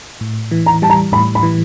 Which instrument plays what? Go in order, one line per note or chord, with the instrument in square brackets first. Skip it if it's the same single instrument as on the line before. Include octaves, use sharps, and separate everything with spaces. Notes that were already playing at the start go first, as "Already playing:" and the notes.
[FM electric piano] A2
E3
[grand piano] A#5
[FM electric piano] G3 [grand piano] A5
[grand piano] A#5
[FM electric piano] A2 [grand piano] B5
[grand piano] B5
[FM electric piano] E3